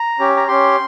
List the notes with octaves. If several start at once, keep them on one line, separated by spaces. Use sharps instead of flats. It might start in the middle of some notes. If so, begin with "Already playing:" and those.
Already playing: A#5
C#4 G4
A#5
C#4 G4 C6